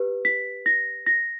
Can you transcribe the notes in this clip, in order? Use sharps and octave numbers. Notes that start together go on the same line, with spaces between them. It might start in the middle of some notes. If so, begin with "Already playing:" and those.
Already playing: G4 B4
B6
A#6
A#6